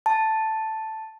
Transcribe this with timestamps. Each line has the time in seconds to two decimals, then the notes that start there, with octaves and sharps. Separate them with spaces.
0.06 A5